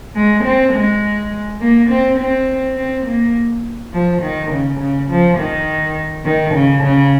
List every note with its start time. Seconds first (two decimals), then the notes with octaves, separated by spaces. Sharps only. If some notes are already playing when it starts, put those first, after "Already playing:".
0.15 G#3
0.43 C4
0.73 G#3
1.60 A#3
1.89 C4
2.18 C4
2.76 C4
3.05 A#3
3.92 F3
4.21 D#3
4.51 C#3
4.79 C#3
5.09 F3
5.37 D#3
6.25 D#3
6.54 C#3
6.82 C#3